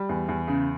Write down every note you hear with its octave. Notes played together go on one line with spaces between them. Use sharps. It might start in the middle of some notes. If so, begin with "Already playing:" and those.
Already playing: G3
E2
E2
C#3